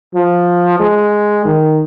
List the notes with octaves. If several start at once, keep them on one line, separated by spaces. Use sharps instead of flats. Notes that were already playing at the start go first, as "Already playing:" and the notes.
F3
G#3
D#3